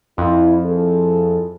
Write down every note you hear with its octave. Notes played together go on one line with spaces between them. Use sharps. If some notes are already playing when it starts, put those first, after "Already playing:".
F2 E4
E4 G#4 A4